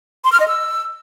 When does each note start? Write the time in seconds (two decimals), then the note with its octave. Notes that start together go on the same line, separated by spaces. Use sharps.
0.24 C6
0.32 F6
0.40 D#5
0.48 E6